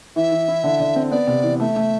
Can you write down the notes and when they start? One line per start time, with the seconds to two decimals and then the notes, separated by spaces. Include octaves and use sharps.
0.16 E3 E5
0.32 E3
0.48 E4
0.64 D3
0.80 D3
0.96 C4
1.11 B3 D5
1.27 C3
1.43 E3
1.60 A3 E5
1.76 A3